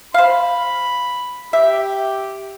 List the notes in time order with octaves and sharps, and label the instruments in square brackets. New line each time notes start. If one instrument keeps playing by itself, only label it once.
[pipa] C5 F5 [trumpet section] B5
[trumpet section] G4 [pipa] E5